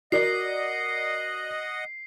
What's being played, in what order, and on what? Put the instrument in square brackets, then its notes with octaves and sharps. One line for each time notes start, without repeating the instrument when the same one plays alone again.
[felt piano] F#4 A#4 D5 [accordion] D#5 F#5 [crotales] C7